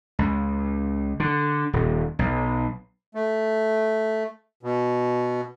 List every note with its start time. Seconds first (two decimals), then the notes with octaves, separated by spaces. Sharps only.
0.19 C#2
1.20 D3
1.73 D#1
2.19 B1
3.15 A3
4.63 B2